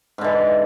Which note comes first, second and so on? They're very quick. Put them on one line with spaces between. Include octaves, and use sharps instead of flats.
G#2 D3 E3